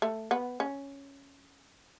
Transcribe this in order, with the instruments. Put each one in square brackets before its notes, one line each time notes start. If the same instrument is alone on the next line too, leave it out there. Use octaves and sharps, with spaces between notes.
[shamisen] A3
B3
C#4